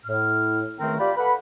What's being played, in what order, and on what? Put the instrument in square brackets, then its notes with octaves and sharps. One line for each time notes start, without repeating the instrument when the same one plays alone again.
[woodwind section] A2 F6
C#2 D#3 A3 C4 A#4 G5
F4 G4 D5 G5 B5
A4 B4 F#5 B5